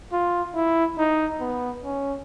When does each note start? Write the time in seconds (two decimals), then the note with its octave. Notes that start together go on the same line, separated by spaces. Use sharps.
0.12 F4
0.55 E4
0.98 D#4
1.41 B3
1.84 C#4